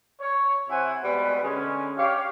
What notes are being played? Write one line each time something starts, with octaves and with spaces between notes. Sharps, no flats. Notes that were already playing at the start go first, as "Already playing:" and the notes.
C#5
C3 E4 C5 F#5 G#5
B2 G3 G#3 B4
D3 G#3 C#4
G4 C#5 F5